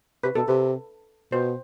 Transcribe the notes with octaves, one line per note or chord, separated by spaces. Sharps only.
C3 B4
B2 A4
C3 B4
B2 C5